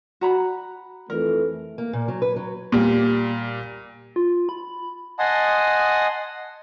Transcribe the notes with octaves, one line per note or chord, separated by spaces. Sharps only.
F#4 A#5 B5
F2 E3 A3 A#4
A#3
A#2
F#3
B4
F#3
A#2 G3
F4
B5
D#5 F#5 G#5 A5 C6 D#6